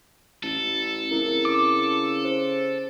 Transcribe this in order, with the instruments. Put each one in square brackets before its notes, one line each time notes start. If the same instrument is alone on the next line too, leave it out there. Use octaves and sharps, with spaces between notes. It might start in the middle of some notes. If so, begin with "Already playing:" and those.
[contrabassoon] A1 [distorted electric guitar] A4
[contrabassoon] C#3 [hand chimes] C4 E4 A#4
[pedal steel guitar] D6
[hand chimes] C5